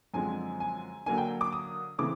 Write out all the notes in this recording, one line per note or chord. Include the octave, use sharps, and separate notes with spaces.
F#2 D3 F3 G#3 C4 G#5
G#5
D3 F#3 A#3 D4 G#5
G5
D6
D#6
C#3 E3 A3 C4 D6